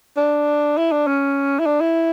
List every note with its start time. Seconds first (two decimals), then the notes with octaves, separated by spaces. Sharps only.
0.17 D4
0.77 E4
0.92 D4
1.07 C#4
1.59 E4
1.66 D4
1.81 E4